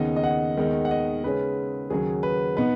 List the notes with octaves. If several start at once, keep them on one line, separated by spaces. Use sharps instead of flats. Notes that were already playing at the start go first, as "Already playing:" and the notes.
Already playing: D#2 C#3 B3 D#4 D#5
D#5
F#5
D#2 D#3 G#3 B3 D#4
F#5
D#5
C#3 G#3 C#4 B4
D#2 C#3 F#3 G#4
B4
B2 B3 D#4 B4